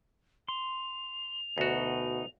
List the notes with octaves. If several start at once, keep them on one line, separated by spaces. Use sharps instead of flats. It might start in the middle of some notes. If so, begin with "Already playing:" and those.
C6 F7
D2 B2 D#4 F#4